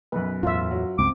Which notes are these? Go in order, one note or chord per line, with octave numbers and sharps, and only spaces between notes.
B1 F#2 B4
E2 A2 F4 E5
F#2 F#3
C#2 G2 C4 D6